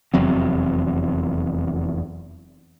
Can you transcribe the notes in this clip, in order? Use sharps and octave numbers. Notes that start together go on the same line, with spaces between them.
F1 E2 F#3 C4